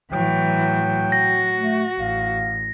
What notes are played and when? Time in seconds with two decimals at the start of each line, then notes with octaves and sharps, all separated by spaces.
0.12 A2 E3 F#3 G5
1.12 F#4 A#6
1.56 A3
1.99 A1 F5